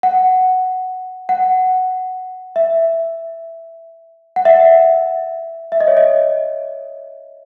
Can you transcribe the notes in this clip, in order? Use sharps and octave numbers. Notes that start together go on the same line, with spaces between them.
F#5
F#5
E5
F#5
E5
E5
D#5
C#5
D#5